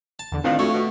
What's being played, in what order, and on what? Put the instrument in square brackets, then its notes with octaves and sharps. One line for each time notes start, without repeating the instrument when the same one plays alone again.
[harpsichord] A5
[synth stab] E2 D3
[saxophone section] E2 A2 D#3 [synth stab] C4 D4 F4 [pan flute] F5
[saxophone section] F2 C#5 [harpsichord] A3 [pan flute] F#4
[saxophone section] B2